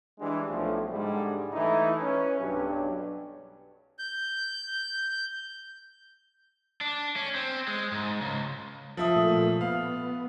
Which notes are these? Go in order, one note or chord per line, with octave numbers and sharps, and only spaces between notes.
E3 G3 G#3 D4
B1 A2 F3 A3
G#2 D3 G3 G#3
E3 A3 D#4 E4
C#4 B4
B1 G2 F#3 D4 G4
G6
D4
C#4
C4
G#3
G#2
C#2
F3 E5 D#6
A#2 A3
B3 F5